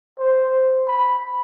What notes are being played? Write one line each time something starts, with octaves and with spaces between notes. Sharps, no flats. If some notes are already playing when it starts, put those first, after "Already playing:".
C5
B5